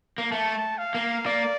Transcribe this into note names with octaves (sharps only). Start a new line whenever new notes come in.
A#3
A3 A5
F5
A#3
A#3 D5